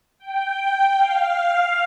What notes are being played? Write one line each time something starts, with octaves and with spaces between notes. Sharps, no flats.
G5
F5